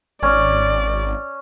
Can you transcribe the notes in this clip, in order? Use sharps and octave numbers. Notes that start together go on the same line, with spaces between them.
G#1 C#4 D5